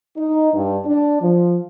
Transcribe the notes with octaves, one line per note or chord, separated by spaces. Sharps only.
D#4
G2
D4
F3